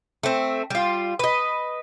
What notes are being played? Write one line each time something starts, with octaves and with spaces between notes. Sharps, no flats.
A3 C4
G3 F4
B4 D#5